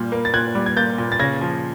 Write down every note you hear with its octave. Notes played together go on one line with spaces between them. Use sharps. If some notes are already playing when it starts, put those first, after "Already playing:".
Already playing: A#2 G3
A#3
A6
A#2 F#6 G#6
G3
G#6
A#3 G6 A6
A#2
A6
C#3 G#6 A#6
F3